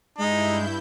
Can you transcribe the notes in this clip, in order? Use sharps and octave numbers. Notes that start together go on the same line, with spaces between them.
G2 G#3 D#4 E4 G6